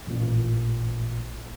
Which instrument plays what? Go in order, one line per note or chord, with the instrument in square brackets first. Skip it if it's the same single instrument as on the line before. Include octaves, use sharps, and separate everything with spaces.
[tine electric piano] A1 A#2